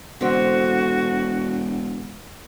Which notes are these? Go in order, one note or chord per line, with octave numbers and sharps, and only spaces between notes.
E1 D3 C4 F#4